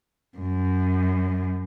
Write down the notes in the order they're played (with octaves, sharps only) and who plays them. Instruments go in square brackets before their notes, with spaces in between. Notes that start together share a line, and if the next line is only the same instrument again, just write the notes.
[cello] F#2